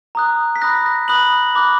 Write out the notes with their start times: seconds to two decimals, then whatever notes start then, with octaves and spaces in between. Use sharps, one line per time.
0.15 A#5 D#6 F#6
0.56 B6
0.61 B5 D#6 F#6 A#6
0.86 A#6
1.08 B5 D#6 F#6 F#7
1.55 B5 D6 F#6